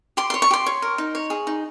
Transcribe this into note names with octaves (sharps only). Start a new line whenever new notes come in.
G4 C6
C6
C#5
C#6
G4 C6
C#5
A#4
D#4
C#5
G#4
D#4